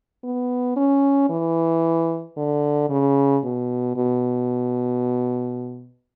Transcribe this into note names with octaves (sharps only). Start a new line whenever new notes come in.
B3
C#4
E3
D3
C#3
B2
B2